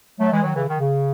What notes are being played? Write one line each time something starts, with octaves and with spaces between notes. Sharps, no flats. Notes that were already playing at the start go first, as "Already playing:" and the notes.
F#3 A3
E3 G#3
D#3 F#3
C#3 E3
D#3
C#3